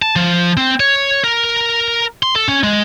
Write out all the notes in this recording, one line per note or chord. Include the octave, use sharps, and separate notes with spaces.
A5
F3
C4
C#5
A#4
C6
A4
C#4
G#3